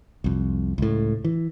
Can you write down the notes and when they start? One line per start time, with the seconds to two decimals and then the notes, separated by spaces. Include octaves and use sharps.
0.24 C2 F2
0.78 C#2 A2
1.24 E3